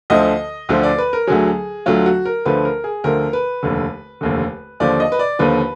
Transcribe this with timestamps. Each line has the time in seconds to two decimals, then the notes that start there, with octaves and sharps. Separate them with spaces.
0.10 D2 D3 F3 D#5
0.69 D2 D3 F3
0.83 D5
0.98 B4
1.13 A#4
1.27 D2 D3 F#3 G#4
1.86 D2 D3 F#3 F4
2.06 F#4
2.25 A#4
2.45 D2 D3 F3 B4
2.65 A#4
2.84 G#4
3.04 D2 D3 F3 A#4
3.33 B4
3.63 F1 D#2 D3
4.21 F1 D#2 D3
4.80 D#2 D3 F3 D5
5.00 D#5
5.12 B4
5.19 D5
5.39 D#2 D3 F3 B4